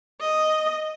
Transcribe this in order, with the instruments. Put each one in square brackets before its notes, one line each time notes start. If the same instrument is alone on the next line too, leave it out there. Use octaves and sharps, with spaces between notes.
[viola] D#5